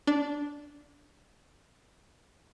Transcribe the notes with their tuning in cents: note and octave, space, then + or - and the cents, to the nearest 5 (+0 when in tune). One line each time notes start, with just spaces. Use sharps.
D4 -10